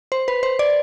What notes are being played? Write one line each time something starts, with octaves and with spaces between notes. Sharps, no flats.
C5
B4
C5
D5